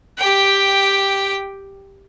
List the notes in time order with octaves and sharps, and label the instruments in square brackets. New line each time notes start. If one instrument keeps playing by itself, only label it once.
[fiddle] G4 G5